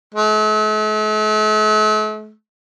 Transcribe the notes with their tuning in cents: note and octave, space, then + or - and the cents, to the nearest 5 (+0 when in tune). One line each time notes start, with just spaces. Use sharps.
A3 -45